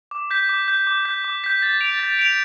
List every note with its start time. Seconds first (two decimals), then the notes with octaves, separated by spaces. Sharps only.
0.11 D6
0.31 G6 B6
0.49 D6
0.68 G6 B6
0.87 D6
1.05 G6 B6
1.24 D6
1.44 G6 B6
1.62 A6
1.81 D7 F7
1.99 A6
2.19 D7 F7